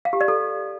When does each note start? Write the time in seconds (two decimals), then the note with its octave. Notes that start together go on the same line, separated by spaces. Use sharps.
0.05 F5
0.13 G4
0.21 D5
0.28 A4